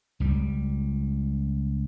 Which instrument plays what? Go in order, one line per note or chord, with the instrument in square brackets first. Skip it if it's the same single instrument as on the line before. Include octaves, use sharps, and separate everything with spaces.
[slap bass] C#2 G3